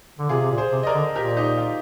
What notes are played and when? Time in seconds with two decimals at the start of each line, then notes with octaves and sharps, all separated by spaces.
0.19 D3
0.29 C3 F4 G#4
0.41 C3
0.51 A#2
0.58 G#4 C5
0.72 C3
0.83 D#5
0.87 A#4 D5
0.95 D3
1.15 A#2 G4 A#4
1.37 D#4 G4
1.58 F4